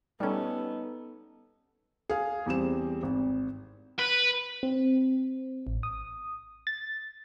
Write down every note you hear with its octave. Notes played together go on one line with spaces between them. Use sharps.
G3 B3 C#4 D#4 A4
G#4 F5
E2 G3 C4 E7
G#1
B4
C4
A1
D#6
A6